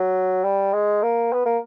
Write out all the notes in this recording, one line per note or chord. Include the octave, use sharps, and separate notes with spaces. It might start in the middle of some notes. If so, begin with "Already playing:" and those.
Already playing: F#3
G3
G#3
A#3
B3
A#3